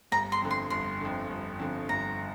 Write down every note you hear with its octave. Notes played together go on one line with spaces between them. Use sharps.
G1 A#5
C6
F2 D3
C6
G1 C6
F2 D3
G1
F2 D3
G1 A#5